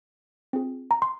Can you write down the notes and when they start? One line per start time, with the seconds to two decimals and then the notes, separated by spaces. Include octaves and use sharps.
0.53 C4 F4 G#4
0.91 A#5
1.02 C6